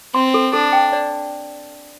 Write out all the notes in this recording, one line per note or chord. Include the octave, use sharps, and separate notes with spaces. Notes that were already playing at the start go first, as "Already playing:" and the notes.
C4 C6
A4
D4 A4
G5
D5